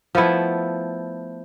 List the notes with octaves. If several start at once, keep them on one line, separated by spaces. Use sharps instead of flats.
F3 A3 B3 E4